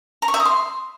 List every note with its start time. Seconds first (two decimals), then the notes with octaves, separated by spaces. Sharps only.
0.22 A#5
0.28 C#6
0.34 E5
0.40 D#6
0.45 C6